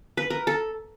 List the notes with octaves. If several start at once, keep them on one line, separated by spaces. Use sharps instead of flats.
B4
A#4
A4